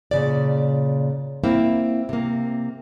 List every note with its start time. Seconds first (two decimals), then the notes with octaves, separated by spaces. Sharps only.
0.11 A#2 C#3 D5
1.44 A#3 C4 E4
2.09 C3 A#3